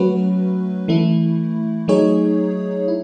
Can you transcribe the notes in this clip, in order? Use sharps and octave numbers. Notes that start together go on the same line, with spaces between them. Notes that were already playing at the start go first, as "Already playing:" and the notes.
Already playing: F#3 A3 C#4 F#4 B4
E3 A3 E4
F#3 A3 D#4 G#4 C#5
E4